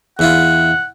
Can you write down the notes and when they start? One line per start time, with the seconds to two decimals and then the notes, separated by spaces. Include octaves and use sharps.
0.19 E2 E4 F4 F#5